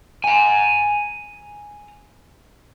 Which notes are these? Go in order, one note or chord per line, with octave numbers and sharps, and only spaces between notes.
G#5 A#5